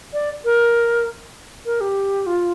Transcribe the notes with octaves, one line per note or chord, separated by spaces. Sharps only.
D5
A#4
A#4
G4
F4